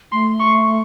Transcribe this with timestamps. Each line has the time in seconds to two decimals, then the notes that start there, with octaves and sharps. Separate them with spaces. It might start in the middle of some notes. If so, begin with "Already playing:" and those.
0.12 A3 C6
0.40 C#6